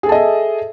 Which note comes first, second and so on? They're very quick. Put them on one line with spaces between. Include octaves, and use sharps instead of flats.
G#4 A4 A5 D#5 E5